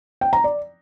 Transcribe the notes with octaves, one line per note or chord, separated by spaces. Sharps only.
G5
A#5
D5